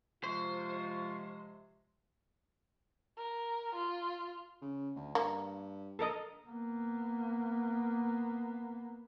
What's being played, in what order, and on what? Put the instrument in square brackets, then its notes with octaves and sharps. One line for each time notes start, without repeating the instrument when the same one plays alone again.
[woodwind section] C3 F3 G#3 [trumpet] F4 [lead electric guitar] C5 [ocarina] C#6
[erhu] A#4
F4
[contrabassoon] C#3
D2
[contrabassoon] G2 [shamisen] A#3
[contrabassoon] A#1 [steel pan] A4 A#4 D#5
[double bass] A#3 B3